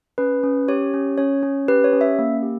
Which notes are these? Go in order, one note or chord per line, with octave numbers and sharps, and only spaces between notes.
C#4 B4
C#4
G4 C#5
C#4
C#4 C#5
C#4
G4 B4
C#5
C#4
E5
A#3
G4